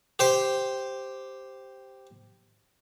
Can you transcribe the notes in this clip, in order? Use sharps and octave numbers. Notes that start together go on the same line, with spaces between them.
G4 C5 G5